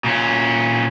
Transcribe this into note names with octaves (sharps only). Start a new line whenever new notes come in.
A#2 C#4